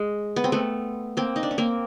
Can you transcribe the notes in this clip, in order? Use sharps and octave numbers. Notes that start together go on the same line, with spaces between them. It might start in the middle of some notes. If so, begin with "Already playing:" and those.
Already playing: G#3
B3
C4
A3 B3
A#3 C4
D#4
D4
C#4
A#3 C4